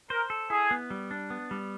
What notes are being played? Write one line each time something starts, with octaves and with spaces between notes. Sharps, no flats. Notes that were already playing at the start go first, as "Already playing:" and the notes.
A#4 C5
A4
E4 G#4
B3
G3
D4
B3
G3